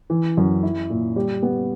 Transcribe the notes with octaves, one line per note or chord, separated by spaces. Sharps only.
E3
F#2
E4
A#2
G3
B3